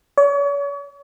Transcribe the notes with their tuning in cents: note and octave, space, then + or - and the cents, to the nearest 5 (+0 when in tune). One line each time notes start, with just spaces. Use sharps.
C#5 +40